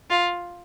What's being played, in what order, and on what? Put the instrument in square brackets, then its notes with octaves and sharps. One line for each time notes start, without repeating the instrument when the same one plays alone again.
[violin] F4